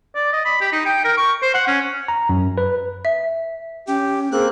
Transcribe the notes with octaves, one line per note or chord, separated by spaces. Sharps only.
D5
D#5
B5
G4
D#4
G5
A#4
C#6
C5
F#5
C#4
A#5
F#2
B4
E5
C#4 G4
A#3 C4 G#4 F#6